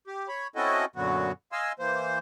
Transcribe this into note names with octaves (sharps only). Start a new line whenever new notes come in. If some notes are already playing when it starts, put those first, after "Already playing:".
G4
C#5 B5
C4 C#4 E4 F#4 A4 D#5
F#2 A#2 D3 F#3 B3 F#4
D#5 F5 G#5 C6 E6
E3 A#3 C5